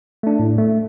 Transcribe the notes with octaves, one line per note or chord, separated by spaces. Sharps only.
A3 D4
A2
A3